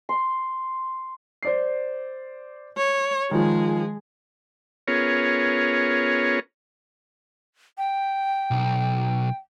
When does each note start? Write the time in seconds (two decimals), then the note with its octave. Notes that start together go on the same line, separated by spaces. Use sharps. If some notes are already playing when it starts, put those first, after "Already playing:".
0.09 C6
1.43 C5 D5 C7
2.78 C#5
3.31 D#3 F3 G#3 G#4
4.88 B3 C#4 F4 G#4 A#4 C#5
7.78 G5
8.51 B1